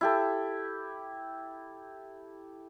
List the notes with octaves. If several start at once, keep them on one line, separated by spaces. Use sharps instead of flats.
E4 G4 A4